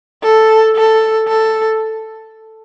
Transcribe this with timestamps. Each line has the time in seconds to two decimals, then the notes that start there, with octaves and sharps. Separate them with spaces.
0.23 A4
0.76 A4
1.27 A4